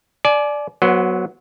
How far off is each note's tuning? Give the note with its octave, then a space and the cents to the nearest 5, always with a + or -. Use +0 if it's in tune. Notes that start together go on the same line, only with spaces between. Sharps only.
D5 +0 G#5 +40
F#3 +0 B3 -30 C5 +0